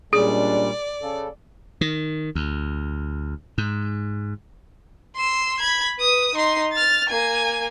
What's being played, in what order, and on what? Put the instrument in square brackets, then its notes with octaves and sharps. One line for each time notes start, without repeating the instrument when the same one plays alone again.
[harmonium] A#2 G3 [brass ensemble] G#3 C#4 D4 [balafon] G#4 [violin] D5
[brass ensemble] C#3 [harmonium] A4
[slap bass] D#3
D2
G#2
[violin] C6 E6
B5 G#6
B4 D#6
D#4 C6
F6 A6
A#3 G#5